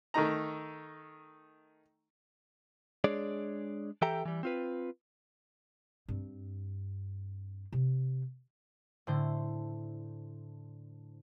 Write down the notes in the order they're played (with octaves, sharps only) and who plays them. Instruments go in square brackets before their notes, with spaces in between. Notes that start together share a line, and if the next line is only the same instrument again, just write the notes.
[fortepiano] D#3 A3 D#4 A#5
[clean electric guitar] G#3 D4 G#4 C#5 D5
E3 G4 A4 E5 G5 A#5
E3 G3
C4 F4 B4
[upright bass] G2 C4
C3
[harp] A2 D3 C5